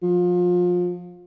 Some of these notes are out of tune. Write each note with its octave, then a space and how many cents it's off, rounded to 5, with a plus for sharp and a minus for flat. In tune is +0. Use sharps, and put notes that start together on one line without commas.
F3 +25